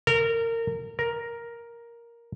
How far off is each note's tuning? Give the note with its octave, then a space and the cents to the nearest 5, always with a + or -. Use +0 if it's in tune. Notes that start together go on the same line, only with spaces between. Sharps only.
A#4 -25
A#4 +5